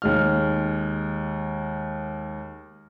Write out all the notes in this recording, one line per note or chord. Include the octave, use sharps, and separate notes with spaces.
D#2 G#3 F6